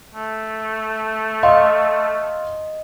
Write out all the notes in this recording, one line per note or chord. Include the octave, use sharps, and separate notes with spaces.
A3
D#5 F5 C6